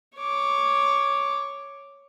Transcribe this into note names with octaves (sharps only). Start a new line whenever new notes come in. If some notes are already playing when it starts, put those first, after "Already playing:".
C#5 D6